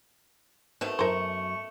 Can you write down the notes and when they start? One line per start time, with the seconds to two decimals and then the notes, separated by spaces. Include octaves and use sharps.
0.81 B2 D#3 A3 C4
0.99 F#2 F#4 A#4 C5 A5 C#6